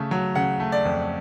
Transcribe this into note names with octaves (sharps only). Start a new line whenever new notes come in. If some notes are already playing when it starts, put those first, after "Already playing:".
Already playing: C#3 A3
F#3
C#3 F#5
A3
D5
F2